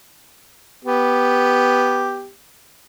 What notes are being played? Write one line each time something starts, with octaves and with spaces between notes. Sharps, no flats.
B3 G4